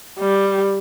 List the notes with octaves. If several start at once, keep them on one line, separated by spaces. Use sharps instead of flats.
G3